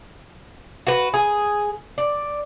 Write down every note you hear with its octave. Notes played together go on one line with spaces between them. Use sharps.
F#4 B4
G#4
D5